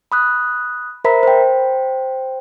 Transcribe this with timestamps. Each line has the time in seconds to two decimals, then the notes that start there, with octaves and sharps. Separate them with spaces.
0.12 B5 D#6 F#6
1.05 A#4 C5 E5 A#5 B5 B6
1.23 C5 G5